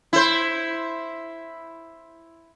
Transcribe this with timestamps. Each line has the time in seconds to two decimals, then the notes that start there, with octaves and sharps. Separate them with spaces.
0.13 E4 C5